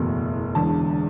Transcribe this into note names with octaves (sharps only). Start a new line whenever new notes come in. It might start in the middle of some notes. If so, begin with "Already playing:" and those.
Already playing: F#1 E2 B2 A3
E1 E2 D3 A5